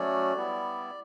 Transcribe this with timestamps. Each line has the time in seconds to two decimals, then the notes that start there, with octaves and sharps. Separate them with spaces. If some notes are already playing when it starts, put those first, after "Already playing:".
Already playing: F#3 A3 C#4 D5
0.34 G3 B3 E4